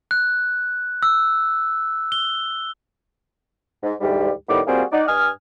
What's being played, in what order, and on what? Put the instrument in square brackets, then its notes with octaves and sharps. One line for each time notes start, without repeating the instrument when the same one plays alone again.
[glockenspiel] F#6
E6
G7
[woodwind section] G#2
D2 G#2 E3 G3
A2 D#3 G3 B3 D6
G3 A#3 C4 F4 F#4 G#4
D#4 D5 F#5
G2 G#5 D#6 F6